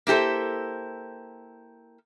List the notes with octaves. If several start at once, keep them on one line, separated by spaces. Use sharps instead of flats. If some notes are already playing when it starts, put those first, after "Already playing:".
A#3 E4 G4 A4 C5